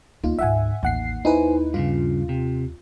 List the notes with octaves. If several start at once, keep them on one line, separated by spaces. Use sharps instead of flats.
D2 A#3 D#4 F4
D2 G#2 E5 F#5 G#5
A1 D#2 F#5 C7
D#4 E4 B4 C5 G#5
G2 A#2 C#3 F4
C3